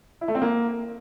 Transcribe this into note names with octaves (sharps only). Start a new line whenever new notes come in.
E4
A3
C4
A#3